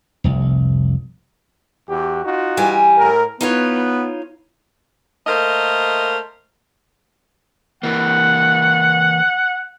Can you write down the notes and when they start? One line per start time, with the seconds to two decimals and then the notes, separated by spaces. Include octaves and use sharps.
0.24 F1 C2
1.89 E2 F#4 G4
2.25 D#4 F4 F#4
2.57 E3 G3 G#5
2.98 A2 A#4
3.41 B3 D#4 F4 C#5
5.27 A3 A#3 A#4 C5 D#5
7.83 E3 A#3 F#5